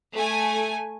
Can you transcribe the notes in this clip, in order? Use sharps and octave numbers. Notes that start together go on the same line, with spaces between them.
A3 G#5